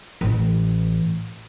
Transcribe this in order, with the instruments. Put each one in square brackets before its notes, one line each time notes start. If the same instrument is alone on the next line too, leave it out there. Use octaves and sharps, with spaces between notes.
[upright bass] A1 E3